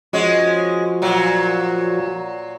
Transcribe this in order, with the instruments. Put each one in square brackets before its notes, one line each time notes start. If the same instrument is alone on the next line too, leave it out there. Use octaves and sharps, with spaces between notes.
[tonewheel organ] F3 F#4 [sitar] G#3 C#4
[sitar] A#2 F#3